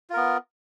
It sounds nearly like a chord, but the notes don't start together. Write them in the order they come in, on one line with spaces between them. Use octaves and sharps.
F4 A#4 B3